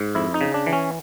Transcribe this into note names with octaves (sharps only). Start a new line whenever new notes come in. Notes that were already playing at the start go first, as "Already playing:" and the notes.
Already playing: G#2
F2 E4
D#4
C#3
D4
E3
C#4